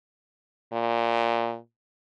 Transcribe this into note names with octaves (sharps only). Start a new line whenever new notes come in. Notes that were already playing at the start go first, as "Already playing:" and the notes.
A#2